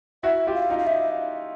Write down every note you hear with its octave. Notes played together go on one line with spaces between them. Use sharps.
E4 F#4 E5
F4 G4
F5
D#4 F4
F5
D#4 E5